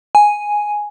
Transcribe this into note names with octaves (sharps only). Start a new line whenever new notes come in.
G#5